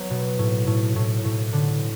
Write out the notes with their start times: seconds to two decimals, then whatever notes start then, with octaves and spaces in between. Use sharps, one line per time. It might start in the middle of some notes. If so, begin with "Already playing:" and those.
Already playing: F#3 B3
0.10 B2
0.39 A2
0.67 A2
0.96 A2
1.25 A2
1.53 D3